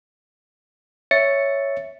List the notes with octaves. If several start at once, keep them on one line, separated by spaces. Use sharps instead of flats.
C#5 E5 A6 C#7